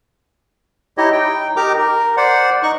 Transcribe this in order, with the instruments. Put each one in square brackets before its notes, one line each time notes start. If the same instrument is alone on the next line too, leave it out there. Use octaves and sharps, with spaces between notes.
[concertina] D#4 E4 G4 C#5 D#5
D#4 G5
D#4 G4 A#4 A#5 D6
A#4
C5 D5 F#5
D#4 C#6 F#6